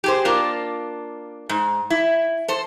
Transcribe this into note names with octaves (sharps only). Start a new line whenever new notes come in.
G4 G#4 C5
A#3 D4 F4
G#2
E4
A4 C5